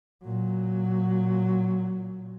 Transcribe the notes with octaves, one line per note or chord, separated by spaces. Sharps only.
A#2 F#3